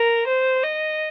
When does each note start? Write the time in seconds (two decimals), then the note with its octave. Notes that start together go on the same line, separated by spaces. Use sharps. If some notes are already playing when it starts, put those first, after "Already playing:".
Already playing: A#4
0.27 C5
0.64 D#5